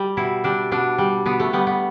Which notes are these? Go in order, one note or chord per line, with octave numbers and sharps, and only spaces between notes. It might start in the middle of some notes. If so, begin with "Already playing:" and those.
Already playing: G3
B2 E4
G3 D4
B2 D4
G3
B2 B3
A3
G3 B3
B3